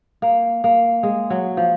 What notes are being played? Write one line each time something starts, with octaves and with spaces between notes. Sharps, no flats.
A#3
A#3
G#3
F#3
F3